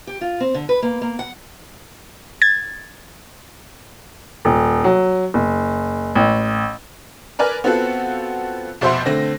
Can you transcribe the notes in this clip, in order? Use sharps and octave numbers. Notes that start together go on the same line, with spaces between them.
G4
F4
C4
D3
B4
A#3
A#3
F#5
G#6 A6
D#1
F#3
F#1
A1
A#4 B4 D5 G#5 F6
B3 C4 F4 F#4 A4 F#5
F1 B2 C5 E5 F#5 C6
D3 A3 C4 A#6